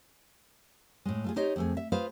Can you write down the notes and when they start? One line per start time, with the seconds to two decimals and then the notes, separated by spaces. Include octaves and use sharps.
1.05 A2 G#3
1.24 A3 F4 G#4
1.36 D#4 G4 C5 C#5 D#5
1.56 F2 A3 G#4
1.77 E5
1.92 F4 G#4 B4 C5 F5